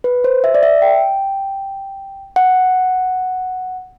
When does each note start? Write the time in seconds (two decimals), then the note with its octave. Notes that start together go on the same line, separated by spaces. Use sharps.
0.04 B4
0.24 C5
0.44 E5
0.55 D5
0.63 E5
0.82 G5
2.36 F#5